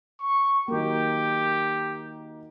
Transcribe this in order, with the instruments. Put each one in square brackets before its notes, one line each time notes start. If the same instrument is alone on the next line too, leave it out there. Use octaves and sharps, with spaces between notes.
[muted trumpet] C#6
[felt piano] D#3 F#3 A#3 [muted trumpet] G4